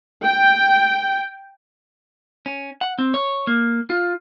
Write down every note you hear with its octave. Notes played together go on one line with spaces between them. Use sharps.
G5
C#4
F#5
C4
C#5
A#3
F4